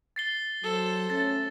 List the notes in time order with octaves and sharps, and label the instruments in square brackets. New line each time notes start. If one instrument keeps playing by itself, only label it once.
[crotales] A6 C7 G7
[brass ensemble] F#3 [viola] A4 C5
[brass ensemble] A3 C#4 [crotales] A6